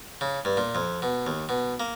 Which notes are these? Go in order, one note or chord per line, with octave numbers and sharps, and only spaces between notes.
C#3
G2
A#2
F2
B2
D#2
B2
A#3